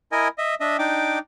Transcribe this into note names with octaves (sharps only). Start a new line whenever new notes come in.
E4 A#4 D#5 G#5
D#5 E5
D4 D#5 E5
D4 D#4 G5 D6